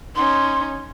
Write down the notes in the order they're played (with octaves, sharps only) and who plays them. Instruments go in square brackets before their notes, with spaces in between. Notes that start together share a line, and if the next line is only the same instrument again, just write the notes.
[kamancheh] C#4 D#4 [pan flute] C6